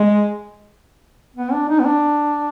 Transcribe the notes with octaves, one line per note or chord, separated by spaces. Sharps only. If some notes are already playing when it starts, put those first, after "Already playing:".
Already playing: G#3
B3
D4
D#4
B3
D4